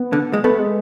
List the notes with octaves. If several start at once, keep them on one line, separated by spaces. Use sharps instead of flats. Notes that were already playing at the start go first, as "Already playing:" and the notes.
Already playing: B3
D3
G#3
A3 B3
G#3